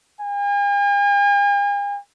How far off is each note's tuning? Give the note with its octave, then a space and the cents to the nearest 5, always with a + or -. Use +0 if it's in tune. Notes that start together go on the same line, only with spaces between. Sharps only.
G#5 -45